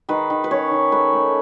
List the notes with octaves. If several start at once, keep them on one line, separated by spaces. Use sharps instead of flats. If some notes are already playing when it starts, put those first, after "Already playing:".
D#3 B4
D#3
B4
C#4 C#5
D#3
A3 B4
A3